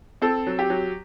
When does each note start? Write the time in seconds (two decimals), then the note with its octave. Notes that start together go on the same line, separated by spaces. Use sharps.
0.22 C4 A4
0.46 F#3
0.59 G4
0.70 F#3